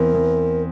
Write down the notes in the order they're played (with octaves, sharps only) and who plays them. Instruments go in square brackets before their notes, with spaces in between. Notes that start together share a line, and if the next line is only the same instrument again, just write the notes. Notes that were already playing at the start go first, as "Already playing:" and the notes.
Already playing: [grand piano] E2 C4 [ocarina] A#4
[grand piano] E2